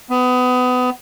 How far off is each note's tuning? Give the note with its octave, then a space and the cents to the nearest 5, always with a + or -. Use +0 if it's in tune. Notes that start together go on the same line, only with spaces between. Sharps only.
B3 +25